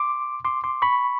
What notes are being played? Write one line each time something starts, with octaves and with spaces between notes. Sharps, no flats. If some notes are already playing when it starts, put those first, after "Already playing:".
Already playing: C6 D6
C6 D6
C6 D6
B5 C#6